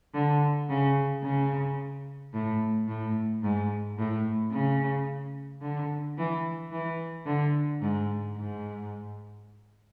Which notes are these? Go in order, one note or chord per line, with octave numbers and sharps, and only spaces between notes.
D3
C#3
C#3
A2
A2
G#2
A2
C#3
D3
E3
E3
D3
G#2
G#2